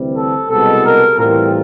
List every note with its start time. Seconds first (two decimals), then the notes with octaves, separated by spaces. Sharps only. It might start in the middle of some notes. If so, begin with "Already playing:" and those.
Already playing: D2 C3 E3 G3 C4
0.16 A4
0.49 C2 B2 G#3 B3 A4
0.83 A#4
1.17 A2 E3 G3 C4 F4 A#4